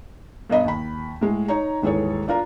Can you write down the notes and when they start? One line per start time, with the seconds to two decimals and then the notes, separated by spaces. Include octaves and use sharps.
0.50 G2 B2 A#4 D#5 B5
0.65 D#2 B5
1.21 A2 G#3
1.48 D#4 C#5 A#5
1.82 D#1 G#2 E3 G#4 A4 C#5
2.28 D4 F4 A#4 A#5